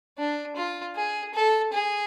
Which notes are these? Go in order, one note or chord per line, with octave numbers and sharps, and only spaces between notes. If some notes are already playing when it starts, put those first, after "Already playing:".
D4
F4
G#4
A4
G#4